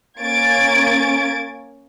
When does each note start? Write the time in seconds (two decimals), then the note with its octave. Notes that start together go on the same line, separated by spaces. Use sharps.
0.21 A#3 C#4 G#6 A6 D7